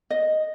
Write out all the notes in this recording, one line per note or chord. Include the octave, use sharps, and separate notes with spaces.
D#5